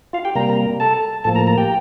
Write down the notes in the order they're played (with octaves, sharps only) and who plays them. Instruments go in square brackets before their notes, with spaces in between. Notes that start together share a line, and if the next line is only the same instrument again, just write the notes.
[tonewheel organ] F4 F5
G4 G5
C3 G3 A#3 A#4 A#5
A4 A5
A2 F3 A#3 A4 A5
A#4 A#5
A#4 A#5
G4 G5